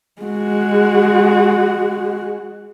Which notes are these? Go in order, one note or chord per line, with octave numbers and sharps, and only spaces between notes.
G#3 F#4